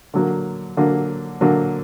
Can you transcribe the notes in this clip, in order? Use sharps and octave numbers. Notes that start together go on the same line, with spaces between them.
D3 F#3 A#3
D3 F#3 A#3
D3 F#3 A#3